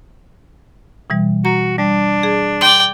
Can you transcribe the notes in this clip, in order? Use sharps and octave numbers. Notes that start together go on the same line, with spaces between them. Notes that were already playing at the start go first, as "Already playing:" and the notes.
B2 E3 G3
F#4 A#5
G3 D4
G#4
D5 G5 C6